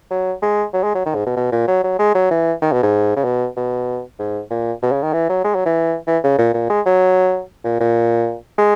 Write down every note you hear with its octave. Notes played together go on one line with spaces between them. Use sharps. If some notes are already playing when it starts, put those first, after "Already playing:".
F#3
G#3
F#3
G#3
F#3
D#3
G#2
B2
B2
A#2
F#3
F#3
G#3
F#3
E3
D#3
B2
G#2
C#3
B2
B2
G#2
A#2
B2
C#3
D#3
E3
F#3
G#3
F#3
E3
E3
C#3
A#2
A#2
G#3
F#3
A#2
A#2
G#3